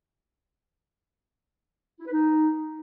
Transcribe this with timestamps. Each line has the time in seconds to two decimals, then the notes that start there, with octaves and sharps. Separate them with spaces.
2.00 E4
2.06 B4
2.11 D#4